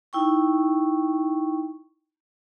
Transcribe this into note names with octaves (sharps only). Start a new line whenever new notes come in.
D#4 E4 G5 C#6